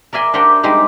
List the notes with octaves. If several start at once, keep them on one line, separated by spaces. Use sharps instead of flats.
A#4 D5 E5 G#5 C6
D4 G4 A#4 C5 F#5 G5
G3 G#3 C4 D#4 G4